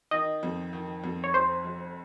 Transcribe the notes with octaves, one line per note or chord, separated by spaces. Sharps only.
D#3 D#5
F2
D#3
F2
C#5
F1 C5
F1